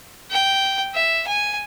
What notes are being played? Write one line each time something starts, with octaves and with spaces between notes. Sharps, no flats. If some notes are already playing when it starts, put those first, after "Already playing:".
G5
E5
G#5